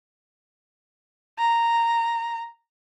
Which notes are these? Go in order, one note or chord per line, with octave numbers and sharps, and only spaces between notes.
A#5